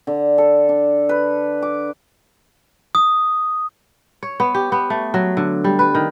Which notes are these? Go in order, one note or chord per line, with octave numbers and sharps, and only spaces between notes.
D3
A4
D4
B4
D6
D#6
C#5
B3
G4
B3
A3
F#3
D3
G3
B4
D#3